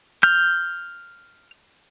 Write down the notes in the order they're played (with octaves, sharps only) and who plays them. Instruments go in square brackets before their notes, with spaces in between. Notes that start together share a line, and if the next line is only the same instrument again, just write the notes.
[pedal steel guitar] F6 G6